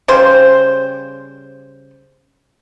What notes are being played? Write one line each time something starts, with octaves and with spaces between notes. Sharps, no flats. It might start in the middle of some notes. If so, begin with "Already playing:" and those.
C#3 G3 C5